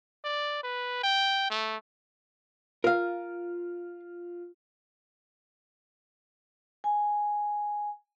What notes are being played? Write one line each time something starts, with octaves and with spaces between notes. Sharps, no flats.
D5
B4
G5
A3
F4 A#4 F5
G#5